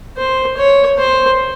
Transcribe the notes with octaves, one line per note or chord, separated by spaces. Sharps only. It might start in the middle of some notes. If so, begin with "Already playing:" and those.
C5
C#5
C5